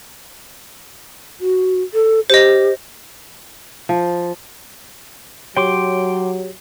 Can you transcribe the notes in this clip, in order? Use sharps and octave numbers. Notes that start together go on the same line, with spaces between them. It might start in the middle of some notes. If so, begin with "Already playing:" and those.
F#4
A4
G4 C5 D#5
F3
F#3 G4 C#5 G5 C6 D6